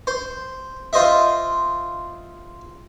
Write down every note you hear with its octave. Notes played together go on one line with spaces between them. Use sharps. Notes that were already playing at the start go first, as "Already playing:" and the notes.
C5
F4 C5 D#5 E5